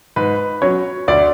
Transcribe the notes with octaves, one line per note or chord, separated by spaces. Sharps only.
G#2 B4
F#3 C#4 C#5
D2 D5